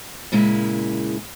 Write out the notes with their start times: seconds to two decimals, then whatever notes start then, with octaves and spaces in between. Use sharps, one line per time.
0.32 A#2 C#3 G#3 A#3 E4